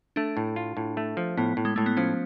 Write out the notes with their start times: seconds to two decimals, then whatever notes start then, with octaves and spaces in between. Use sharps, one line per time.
0.16 A3 D4
0.37 A2
0.56 F4
0.77 A2
0.97 A3
1.17 F3
1.37 A2 B3
1.57 A2
1.65 G#3
1.76 A2 A3
1.86 B3
1.97 F3 C#4